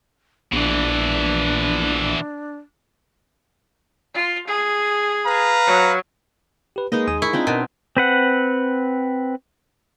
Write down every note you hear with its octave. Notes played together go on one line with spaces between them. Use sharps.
A#1 B2 E3 D4
F4
G#4
B4 F5 A#5
F#3
G4 B4
G#3 A#3 D#4 B4 D#5
D#2 G#5 D#6
E4 A#4 C#6
C4 D4 D#4 F4
B2 A#4
C4 B4 F#5